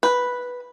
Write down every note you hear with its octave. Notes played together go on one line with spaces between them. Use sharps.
B4